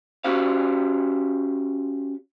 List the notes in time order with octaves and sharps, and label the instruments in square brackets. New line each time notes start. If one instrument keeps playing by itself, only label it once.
[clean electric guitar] C#4 F#4 G4 C5 F5